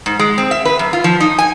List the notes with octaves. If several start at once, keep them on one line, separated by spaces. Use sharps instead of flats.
G#2
G#3
C4
E5
B4
F#2
F4
F3
D#4
G#5